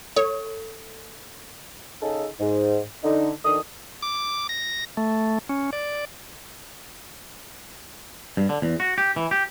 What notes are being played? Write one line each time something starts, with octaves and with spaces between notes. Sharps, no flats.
A4 C#5
C#3 D#4 G#4 A4
G#2
D3 D#4
D2 D#3 D4 A4 D#6
D6
A#6
A3
C#4
D5
G2
D3
E2
F#4
G4
E3
G4